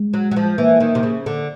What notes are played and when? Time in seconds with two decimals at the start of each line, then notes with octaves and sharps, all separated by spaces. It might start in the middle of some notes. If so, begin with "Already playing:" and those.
Already playing: G#3
0.13 F#3
0.31 F#3
0.36 F3
0.58 E3 A#3
0.80 D#3
0.95 C3
1.03 C#3
1.26 D3